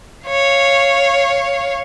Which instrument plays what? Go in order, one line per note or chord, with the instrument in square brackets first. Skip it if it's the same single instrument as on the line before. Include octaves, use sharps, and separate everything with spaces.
[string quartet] C#5 F5